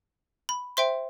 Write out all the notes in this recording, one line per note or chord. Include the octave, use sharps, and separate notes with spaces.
B5
C5 E5 G5 C6